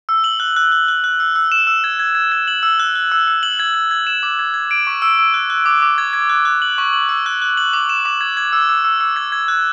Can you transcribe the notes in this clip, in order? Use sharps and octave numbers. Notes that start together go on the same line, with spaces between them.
E6
F#7
F#6
F#6
F#6
F#6
F#6
E6
E6
E7
E6
G#6
G#6
G#6
G#6
F#7
E6
F#6
F#6
E6
E6
F#7
G#6
G#6
G#6
E7
D6
G#6
G#6
D7
C#6
E6
E6
F#6
F#6
D6
D6
G#6
G#6
F#6
F#6
F#7
C#6
F#7
E6
F#6
F#6
F#7
D6
E7
D6
G#6
G#6
E6
E6
E6
E6
G#6
G#6
F#6